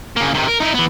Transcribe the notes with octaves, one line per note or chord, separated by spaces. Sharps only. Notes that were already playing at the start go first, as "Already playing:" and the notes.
C#3 A#3
C3 D#3
A#4
D#4 E4
E3 B3